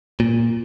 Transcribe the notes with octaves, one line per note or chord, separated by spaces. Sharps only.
A#2